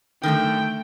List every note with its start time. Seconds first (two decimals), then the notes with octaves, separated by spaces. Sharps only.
0.23 F#2 D3 D#3 A3 G5